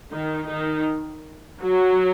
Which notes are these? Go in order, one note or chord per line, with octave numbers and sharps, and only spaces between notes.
D#3 D#4
D#3 D#4
F#3 F#4